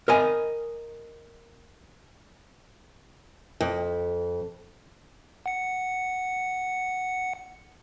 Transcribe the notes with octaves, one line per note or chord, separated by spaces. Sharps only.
A#4 D#5 G#5
F2
F#5 C#7